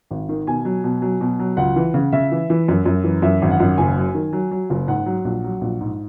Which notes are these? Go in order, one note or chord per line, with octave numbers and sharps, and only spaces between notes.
G#1
D#3
B2 G#5
F#3
B2
F#3
B2
F#3
C#2 F#5
E3
C#3
C#3 E5
E3
E3
F#2
F#2
E3
F#2 E5
G#1
F#5
F#2
F#1 G#5
F#3
D#3
F#3
F#3
F#1
G#2 F#5
F#3
A#1
F#3
A#1
G#2